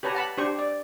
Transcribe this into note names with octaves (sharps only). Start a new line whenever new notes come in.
G4 B4 C#5 A5 A#5
F#5 A5 B5
D4 G4 C5 C#6
D5